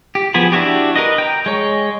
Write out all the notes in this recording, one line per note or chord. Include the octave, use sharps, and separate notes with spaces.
G4
F3 B3 G#4 B5
D4 E4 F#4 G4
A#4 B4 D#5
G5 A#5
G#3 C#5